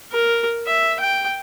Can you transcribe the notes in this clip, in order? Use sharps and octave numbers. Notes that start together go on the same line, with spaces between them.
A#4
E5
G5